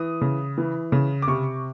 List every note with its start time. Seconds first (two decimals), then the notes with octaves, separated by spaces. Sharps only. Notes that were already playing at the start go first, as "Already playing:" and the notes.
Already playing: E3 D#6
0.21 C#3
0.58 E3
0.92 C#3
1.22 D6
1.27 C3 C#6